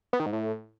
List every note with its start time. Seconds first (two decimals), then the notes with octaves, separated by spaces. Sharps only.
0.13 B3
0.20 D#3
0.26 G#2
0.33 A2